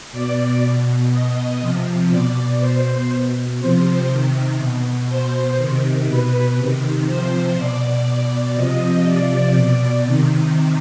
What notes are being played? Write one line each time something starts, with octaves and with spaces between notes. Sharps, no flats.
B2 D5
B2
B2 D#5
C3 F3
B2 D5
B2 C5
B2
C3 F3 C5
C3 D#3
B2
B2 C5
C3 D#3
B2 B4
C3 D#3
C3 F3 C5
B2 D5
B2 D5
C3 F3 D#5
C3 F3 D5
B2 D5
C3 D#3